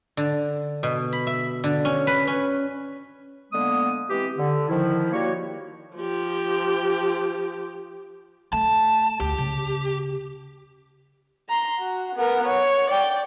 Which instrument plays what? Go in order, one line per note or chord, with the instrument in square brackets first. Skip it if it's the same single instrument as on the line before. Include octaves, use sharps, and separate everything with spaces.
[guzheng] D3
B2
B5
E5
D3
C#4
B4
C#4
[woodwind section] D3 G#3 A#3 B3 D#6
E3 G#3 C4 G4
D3
D#3 F3 E4
G3 A#3 F#4 C#5
[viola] F3 G4
[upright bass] A3 [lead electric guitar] A5
[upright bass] D2 [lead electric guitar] G4
[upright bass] C#3
[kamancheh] A#5 C6
F#4
B3 A#4
C#5
D5 G5